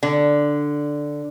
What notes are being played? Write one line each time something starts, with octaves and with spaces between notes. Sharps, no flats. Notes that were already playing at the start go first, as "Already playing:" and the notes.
D3